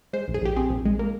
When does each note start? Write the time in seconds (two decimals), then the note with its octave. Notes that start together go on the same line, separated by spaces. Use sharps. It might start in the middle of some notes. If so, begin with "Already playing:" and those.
0.13 G#3 C5
0.28 A#1
0.34 G#4
0.42 A#1 G4
0.56 C4 G#4
0.70 A#1
0.85 G#3
0.99 A#3